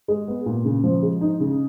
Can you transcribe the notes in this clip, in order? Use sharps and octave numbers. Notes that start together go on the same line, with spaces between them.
G#3
B3
A#2
C#3
F3
G#3
D#4
C#3